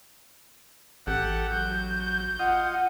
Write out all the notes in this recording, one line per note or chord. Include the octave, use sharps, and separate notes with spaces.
A1 G4 A4 F#5
F#3 G6
F4 D#5 F#5